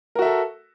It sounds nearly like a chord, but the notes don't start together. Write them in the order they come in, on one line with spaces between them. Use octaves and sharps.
A#4 F#4 E5 A4